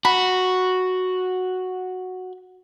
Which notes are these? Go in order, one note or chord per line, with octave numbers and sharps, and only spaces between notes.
F#4 B5